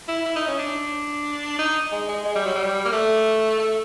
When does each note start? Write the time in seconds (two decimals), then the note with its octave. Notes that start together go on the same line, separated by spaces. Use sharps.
0.08 E4
0.25 E4
0.36 D#4
0.47 C#4
0.59 D4
1.59 D#4
1.92 G#3
2.08 G#3
2.25 G#3
2.35 G3
2.46 F#3
2.55 G3
2.85 A#3
2.92 A3
3.59 A3